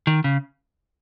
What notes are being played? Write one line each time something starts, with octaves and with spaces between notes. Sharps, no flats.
D#3
C#3